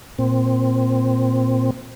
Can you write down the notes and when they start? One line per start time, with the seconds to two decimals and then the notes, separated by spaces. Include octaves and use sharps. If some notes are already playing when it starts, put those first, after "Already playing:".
0.19 A#2 C4